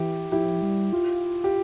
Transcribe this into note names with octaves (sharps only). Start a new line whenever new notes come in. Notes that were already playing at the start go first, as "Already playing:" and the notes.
Already playing: E3 E4 G4
F3 E4 G4
G3
F4
G4